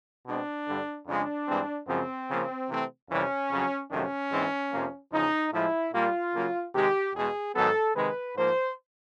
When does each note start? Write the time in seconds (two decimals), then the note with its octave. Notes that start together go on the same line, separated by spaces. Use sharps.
0.27 B2 G#3 C4 D4
0.67 G2 D3 G3
1.07 F2 C#3 F3 G#3 D4
1.48 G2 E3 G#3 C4
1.88 F#2 C#3 F3 G#3 C4
2.29 C#3 F3 A#3
2.69 C3 E3 A3 C4
3.10 F2 C3 E3 G3 C#4
3.50 F2 C#3 F#3
3.90 F2 C3 D#3 F#3 A3 C#4
4.31 G#2 E3 G#3 C4
4.72 F2 C3 F3 A#3
5.12 E2 C#3 F3 D#4
5.52 A2 F3 G#3 E4
5.93 A#2 G3 A#3 F4
6.33 C#3 F#3 A#3
6.74 C3 D#3 G#3 G4
7.14 E2 B2 G#3 G#4
7.55 G#2 D#3 F#3 B3 A4
7.96 C3 D#3 G#3 B4
8.36 G#2 F3 A#3 C5